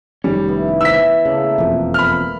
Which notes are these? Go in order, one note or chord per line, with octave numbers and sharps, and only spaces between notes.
F1 D#3 G3 C#4
B3 E4
E3 E6 B6
C#3 A3 A#3
E1 F2 A#3
B5 F6